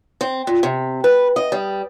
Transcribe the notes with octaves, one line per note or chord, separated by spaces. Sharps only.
C4
A#2
C3
B4
D#5
G3